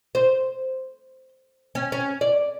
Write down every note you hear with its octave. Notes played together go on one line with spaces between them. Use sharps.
C5
C#4
C#4
D5